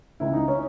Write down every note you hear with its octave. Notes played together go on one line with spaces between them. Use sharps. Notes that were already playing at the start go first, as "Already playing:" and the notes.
C#2 E4
D#4
C#4